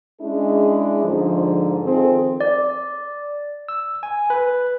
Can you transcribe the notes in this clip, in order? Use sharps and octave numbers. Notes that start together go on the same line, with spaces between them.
G#3 C#4 D4 E4 G#4
G#2 D3 F3
D#3 F3 C4 G#4 A4
D5
E6
G#5
B4